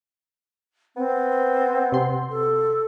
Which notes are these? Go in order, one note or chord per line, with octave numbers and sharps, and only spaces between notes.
B3 C4
C3 C6
A4